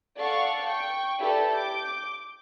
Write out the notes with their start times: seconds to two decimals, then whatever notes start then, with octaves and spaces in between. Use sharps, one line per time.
0.18 A4 D5 F5 F#5 C#6
0.63 G5 C#6
1.19 E4 G4 A4 B4 D5
1.50 D6 G6